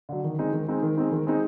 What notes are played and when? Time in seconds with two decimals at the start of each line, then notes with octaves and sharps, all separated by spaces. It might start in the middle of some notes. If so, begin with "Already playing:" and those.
0.09 D3 F#3
0.24 D#3
0.38 G#3 C4 D#4
0.53 D#3
0.68 G#3 C4 D#4
0.83 D#3
0.97 G#3 C4 D#4
1.12 D#3
1.27 G#3 C4 D#4